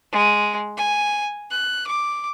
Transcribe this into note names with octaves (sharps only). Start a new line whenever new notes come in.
G#3
G#5
F#6
D6